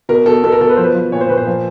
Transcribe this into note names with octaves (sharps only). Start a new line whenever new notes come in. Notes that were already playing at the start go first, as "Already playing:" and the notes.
B2 A#4
B2 A4
B2 A4
A#4
B2 A4
B4
F3 C5
B4
F3
A#2 C#5
C5
A#2 B4
C5
F3